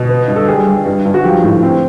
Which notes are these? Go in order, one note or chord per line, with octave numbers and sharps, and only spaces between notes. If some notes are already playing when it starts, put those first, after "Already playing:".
Already playing: B2
B3
G2
A4
G3 G#4
G3
G2
G2
F#4
F3 G4
A2
C4